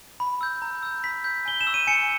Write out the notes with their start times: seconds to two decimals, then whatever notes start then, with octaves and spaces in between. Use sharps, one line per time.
0.20 B5
0.41 E6 G6
0.62 A#5
0.83 E6 G6
1.04 B5 B6
1.24 G6
1.46 G#5 G7
1.61 E7
1.67 C#6 E6
1.74 D#7
1.87 G#5 C#7